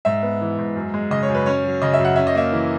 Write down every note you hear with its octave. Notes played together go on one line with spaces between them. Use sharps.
G#2 E5
B3
E3
G#2
F#2
G#3
C#3 D#5
C#5
F#2
B4
C#4 C#5
F#3
C#3 D#5
E5
F#2
F#5
C#4 E5
D#5
A#3 E5
E3